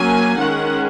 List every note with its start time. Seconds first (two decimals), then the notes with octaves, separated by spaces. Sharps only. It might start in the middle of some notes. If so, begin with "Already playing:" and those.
Already playing: F#3 A#3 C#4 G#5
0.38 D#3 G#3 C#4 F#5